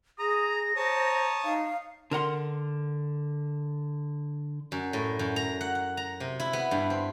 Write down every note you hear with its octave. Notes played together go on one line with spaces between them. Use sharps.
G#4 A#5 D#6 A#6
C5 C#5 A5 A#5 D#6
D#4 F5
D3 A#4 F#5 C6
F#2
A2
F#2
A#5
F#5
F#5
A#5
C3
E4
B3
G2
C4